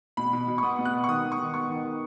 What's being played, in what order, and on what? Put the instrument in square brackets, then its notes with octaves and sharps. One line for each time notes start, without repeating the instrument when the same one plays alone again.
[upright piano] B2 B5
B2
B2
C#6
B3 D#6
B2
F#6
B3
C#6
D#3 D#6
B3
C#6
D#3
B3 C#6
D#3
D#3